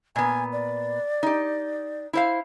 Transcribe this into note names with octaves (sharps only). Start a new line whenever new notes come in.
A#2 B3 G#5
D5
D#4 G4
E4 C5 F5